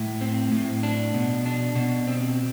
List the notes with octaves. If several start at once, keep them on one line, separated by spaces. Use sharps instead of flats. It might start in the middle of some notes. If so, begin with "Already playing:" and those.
Already playing: A2
C4
A2
D4
B2
D4
B2
C4